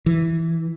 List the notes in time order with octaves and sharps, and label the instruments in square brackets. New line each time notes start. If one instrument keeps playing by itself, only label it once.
[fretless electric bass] E3